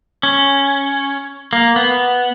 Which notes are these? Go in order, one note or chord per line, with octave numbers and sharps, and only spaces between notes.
C#4
A#3
B3